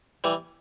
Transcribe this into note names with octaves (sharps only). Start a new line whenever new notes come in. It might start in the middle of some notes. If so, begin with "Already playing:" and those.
E3 G3